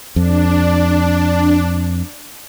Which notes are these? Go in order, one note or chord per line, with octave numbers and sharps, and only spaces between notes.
F2 D4